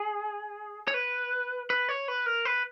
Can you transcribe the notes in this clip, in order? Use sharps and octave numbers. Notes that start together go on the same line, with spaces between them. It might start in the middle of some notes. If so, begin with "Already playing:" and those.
Already playing: G#4
C#5
B4
B4
C#5
B4
A#4
B4